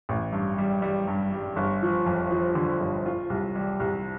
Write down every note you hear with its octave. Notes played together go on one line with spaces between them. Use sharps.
A1
G2
G3
G3
G2
G3
G1
F3
F2
F3
D3
G1
F4
C2
G3
C2